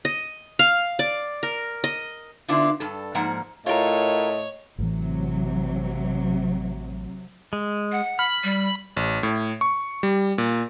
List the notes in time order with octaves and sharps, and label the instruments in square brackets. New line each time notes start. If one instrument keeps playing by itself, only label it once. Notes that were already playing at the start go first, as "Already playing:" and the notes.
[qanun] D#5
F5
D5
A#4
D#5
[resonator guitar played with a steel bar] D3 B3 D4 E4 F4
G2 A4
G#2 F3 A#3 F#5
[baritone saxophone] A2 [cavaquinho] F4 A#4 [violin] C#5 [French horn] D#5
[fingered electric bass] A1 A2 E3 [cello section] C3 F#3
[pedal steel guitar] G#3
[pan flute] F#5
[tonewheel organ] B5 [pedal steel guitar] F6
[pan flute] G3
[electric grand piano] A1
A2
C#6
G3
A#2